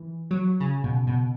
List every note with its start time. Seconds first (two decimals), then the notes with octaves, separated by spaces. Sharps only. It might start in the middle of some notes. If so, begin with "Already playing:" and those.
Already playing: E3
0.31 F#3
0.60 C#3
0.84 B2
1.07 B2